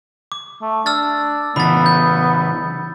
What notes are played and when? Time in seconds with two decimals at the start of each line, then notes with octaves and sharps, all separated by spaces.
0.32 D6
0.62 A3
0.86 D4 E6 F6 A6
1.56 C#3 E3 B3 B5 A6
1.86 G6